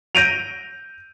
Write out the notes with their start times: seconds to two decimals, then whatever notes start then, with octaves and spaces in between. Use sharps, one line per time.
0.15 G6 A#6 D7 D#7 F7